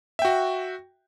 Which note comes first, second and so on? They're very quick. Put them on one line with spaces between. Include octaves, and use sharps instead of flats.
E5 G5 F#4